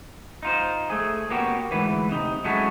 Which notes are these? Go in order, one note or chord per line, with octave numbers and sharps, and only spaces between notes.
D#4 F4 C5
A3 G#4
A#3 B3 C#4 F#4 G4
D2 G#2 E3 B4
C3 D#4
F#3 G#3 A3 C#4 E4 F#4